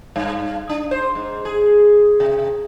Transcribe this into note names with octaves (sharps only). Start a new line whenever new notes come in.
G2
D4
C5
G#2
G#4
C3